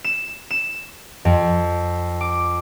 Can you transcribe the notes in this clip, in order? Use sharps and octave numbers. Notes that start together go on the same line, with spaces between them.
E7
E7
F2
D6